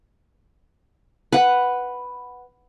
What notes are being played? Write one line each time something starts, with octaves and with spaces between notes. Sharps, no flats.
B4 F#5